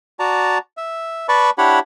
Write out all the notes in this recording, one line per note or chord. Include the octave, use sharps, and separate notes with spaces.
F#4 D5 A5 A#5
E5
B4 D5 A5 B5 C#6
D4 E4 G4 C#5 F#5 B5